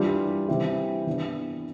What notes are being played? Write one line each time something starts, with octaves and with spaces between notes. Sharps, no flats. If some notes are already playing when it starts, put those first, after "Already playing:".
Already playing: E3 G3 D4 F4
E3 G3 C4 E4 G4
E3 B3 D4